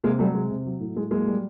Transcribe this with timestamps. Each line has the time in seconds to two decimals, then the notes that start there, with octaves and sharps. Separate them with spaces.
0.04 C3 G#3 A#3
0.19 F#3 G3 A3
0.34 C3 G#3
0.50 C3
0.66 F#3
0.80 A2
0.96 A2 G#3
1.11 F#3 G#3 A#3
1.27 G3